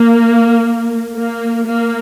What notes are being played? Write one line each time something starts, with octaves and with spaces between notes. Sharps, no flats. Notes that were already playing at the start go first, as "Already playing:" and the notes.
Already playing: A#3
A#3
A#3